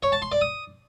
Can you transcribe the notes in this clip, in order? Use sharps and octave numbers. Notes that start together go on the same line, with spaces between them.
C#5
A5
C6
D5
D#6